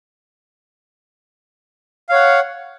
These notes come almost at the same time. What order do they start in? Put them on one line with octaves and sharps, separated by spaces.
F5 C#5 F#5